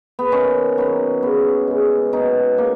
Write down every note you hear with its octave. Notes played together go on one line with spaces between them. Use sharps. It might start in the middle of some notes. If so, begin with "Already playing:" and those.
B3
D#3 C#4
F#3 B3
C#3 B3
G#3 B3
B2 D#4
A#3